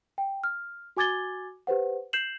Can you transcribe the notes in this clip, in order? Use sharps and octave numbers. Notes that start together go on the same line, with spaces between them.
G5
F6
F#4 G#5 D6 G#6 A6 G7
G4 B4 C5 F#5
G6 C7 E7 F#7